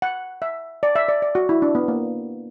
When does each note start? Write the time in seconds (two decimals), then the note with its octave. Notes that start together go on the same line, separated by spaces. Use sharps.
0.02 F#5
0.42 E5
0.83 D5
0.96 E5
1.08 D5
1.22 D5
1.35 F#4
1.49 E4
1.62 D4
1.75 B3
1.88 A#3